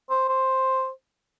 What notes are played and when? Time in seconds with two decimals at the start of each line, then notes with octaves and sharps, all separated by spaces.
0.10 C5
0.29 C5